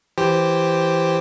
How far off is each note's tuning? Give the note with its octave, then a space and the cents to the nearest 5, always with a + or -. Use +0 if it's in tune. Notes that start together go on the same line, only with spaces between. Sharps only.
E3 +0 G4 +0 C5 +0